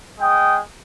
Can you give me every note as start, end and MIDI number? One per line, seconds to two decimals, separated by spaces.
0.19 0.58 56
0.19 0.58 79
0.19 0.58 87